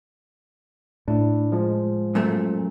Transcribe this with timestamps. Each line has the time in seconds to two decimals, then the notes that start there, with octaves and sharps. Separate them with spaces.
1.08 A2 D4 E4
1.52 F3 G#3
2.15 F#2 A#2 A3